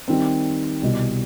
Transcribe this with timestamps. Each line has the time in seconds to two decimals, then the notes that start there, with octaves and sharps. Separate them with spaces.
0.08 D#3 G3 C4
0.82 C2 B2 G3